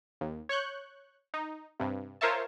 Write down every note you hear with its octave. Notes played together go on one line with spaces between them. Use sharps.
D#2
C#5 C#6 F#6 G6
D#4
G2 C3
F4 A#4 C5 C#5 E5 A5